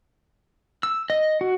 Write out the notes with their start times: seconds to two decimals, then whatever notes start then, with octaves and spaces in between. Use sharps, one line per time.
0.83 E6
1.10 D#5
1.41 F#4